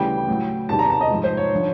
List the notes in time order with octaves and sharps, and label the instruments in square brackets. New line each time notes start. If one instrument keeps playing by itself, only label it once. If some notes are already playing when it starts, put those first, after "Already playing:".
Already playing: [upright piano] D2 C#3 E3 G3 G5
A2 F#3
E2 C3 D#3 G3 A5
A#5
A5
D#5
G#2 F3
C5
C#5
D3 F3